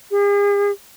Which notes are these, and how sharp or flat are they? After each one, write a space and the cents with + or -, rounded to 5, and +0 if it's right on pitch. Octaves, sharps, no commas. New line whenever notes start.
G#4 -45